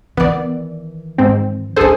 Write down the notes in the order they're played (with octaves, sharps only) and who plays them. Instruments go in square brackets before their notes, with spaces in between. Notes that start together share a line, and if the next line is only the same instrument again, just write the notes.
[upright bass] D#3 E3 [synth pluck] B3 D5
[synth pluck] G#2 C4
[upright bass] C#4 D#4 [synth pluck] G#4 A4 C5